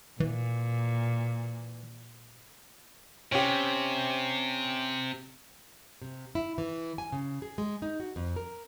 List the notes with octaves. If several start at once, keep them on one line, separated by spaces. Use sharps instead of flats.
A#2 E3
C3 C#4 G4
C3
E4
E3
G#5
C#3
G#4
G#3
D#4
F#4
F2
A#4